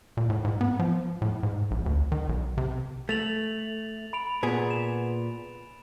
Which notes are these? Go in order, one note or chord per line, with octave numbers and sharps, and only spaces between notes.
A#2
A2
G#2
B3
F3
A2
G#2
A#1
D2
D#3
B1
C3
A3 A6 F7 F#7
B5 D7 F7
A#2 B3 G#4
E7